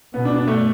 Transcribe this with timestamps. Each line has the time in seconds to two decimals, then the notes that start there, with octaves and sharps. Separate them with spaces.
0.14 B2 B3
0.25 D4
0.36 D4
0.48 A3